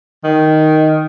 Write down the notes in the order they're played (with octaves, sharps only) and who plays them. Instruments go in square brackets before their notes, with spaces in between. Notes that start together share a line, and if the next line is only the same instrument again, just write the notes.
[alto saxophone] D#3